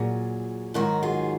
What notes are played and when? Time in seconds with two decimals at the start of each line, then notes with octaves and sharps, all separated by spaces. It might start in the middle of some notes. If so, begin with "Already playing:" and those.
Already playing: A#2 F#3 F4 G#4
0.74 G#2 D#3 F#3 F#4 A#4
1.03 F4 G#4